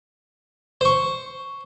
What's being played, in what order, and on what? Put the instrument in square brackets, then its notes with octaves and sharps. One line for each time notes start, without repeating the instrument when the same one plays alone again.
[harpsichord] C5 C#6